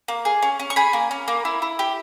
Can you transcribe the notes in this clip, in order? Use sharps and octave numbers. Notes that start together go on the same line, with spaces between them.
A#3
G#4
C#4
C#4
C#6
G#4 B5
A#3
C#4
A#3
E4
E4
G4